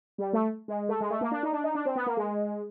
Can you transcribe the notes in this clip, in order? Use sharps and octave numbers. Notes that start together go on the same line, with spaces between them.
G3
A3
G#3
A3
G#3
A3
A#3
D4
D#4
D4
D#4
D4
C4
B3
A#3
G#3